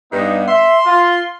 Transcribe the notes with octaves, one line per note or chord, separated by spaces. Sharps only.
G2 B3 D#4
E5 C6
F4